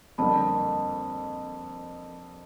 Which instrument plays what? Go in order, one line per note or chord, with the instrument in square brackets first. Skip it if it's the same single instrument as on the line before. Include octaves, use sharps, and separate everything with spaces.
[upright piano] F2 D3 G3 A#3 D4 [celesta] A5 B5